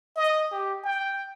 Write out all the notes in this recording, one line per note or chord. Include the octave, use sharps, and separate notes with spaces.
D#5
G4
G5